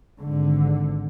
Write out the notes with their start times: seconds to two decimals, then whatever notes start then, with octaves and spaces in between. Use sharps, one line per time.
0.21 G#1 D3